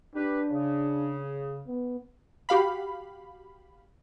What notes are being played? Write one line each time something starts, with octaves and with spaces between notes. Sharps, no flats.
D4 G4 B4
C#3
B3
F#4 G4 F5 B5